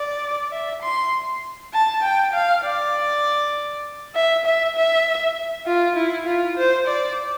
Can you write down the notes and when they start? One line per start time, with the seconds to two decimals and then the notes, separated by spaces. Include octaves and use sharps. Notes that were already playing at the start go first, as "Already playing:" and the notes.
Already playing: D5
0.52 E5
0.82 C6
1.73 A5
2.03 G5
2.33 F5
2.64 D5
4.15 E5
4.45 E5
4.76 E5
5.66 F4
5.96 E4
6.26 F4
6.57 C5
6.87 D5